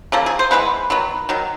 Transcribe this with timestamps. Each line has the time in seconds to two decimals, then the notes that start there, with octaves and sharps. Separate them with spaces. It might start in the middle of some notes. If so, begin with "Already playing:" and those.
0.12 C#3 F3 A#3 A4
0.26 G#4
0.39 C5
0.51 E3 G#3 B3 B4
0.90 D#3 F#3 B3
1.29 D#3 F#3